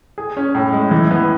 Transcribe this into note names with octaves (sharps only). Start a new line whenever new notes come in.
G#4
C#4
A2
G#3
E3
B3